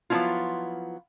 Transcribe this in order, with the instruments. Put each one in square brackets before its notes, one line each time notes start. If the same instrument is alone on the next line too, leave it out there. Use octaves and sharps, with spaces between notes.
[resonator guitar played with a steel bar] F3 F#3 B3 C#4 E4 F4